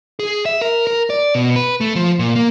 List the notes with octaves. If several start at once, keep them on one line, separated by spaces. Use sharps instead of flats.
G#4
E5
A#4
A#4
D5
B2
B4
A3
F3
A#2
A#3